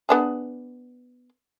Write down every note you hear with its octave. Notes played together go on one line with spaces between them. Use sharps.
B3 D4 G#4